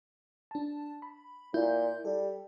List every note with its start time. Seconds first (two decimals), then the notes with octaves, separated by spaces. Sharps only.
0.51 D4 A5
1.02 B5
1.54 A#2 E4 F4 G6
2.05 G3 G4 A4